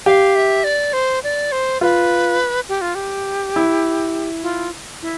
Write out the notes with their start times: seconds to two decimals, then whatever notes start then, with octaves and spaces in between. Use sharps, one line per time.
0.06 G4 F5
0.35 E5
0.64 D5
0.93 C5
1.23 D5
1.52 C5
1.81 F4 B4
2.69 G4
2.81 F4
2.95 G4
3.56 E4
4.43 F4
5.02 E4